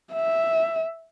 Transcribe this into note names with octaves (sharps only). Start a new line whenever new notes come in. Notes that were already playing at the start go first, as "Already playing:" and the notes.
E5